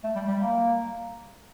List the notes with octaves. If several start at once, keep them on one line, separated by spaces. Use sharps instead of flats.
A3
G3
G3
A#3